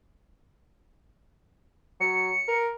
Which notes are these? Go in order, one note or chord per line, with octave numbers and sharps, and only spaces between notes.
F#3 C#7
A#4